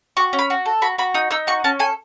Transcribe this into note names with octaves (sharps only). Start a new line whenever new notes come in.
F#4 C#6
C#4
B5
F#4
A4
F#4 B5
F#4 B5
D#4 D#6
D#4 E6
F#4 C#6
C#4 A5
A4 G#5